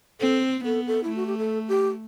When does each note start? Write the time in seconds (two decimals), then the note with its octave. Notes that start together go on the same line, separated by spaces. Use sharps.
0.20 C4 A4
0.65 B3 A4
0.87 A4
1.03 E4
1.09 A3
1.16 F#4
1.26 G4
1.38 A4
1.68 G4